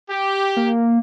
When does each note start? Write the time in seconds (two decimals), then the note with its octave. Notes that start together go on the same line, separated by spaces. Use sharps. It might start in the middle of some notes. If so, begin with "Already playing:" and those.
0.10 G4
0.57 A#3